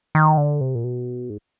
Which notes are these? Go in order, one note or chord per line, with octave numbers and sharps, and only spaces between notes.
D#3
D3
C3
A#2
B2
G#2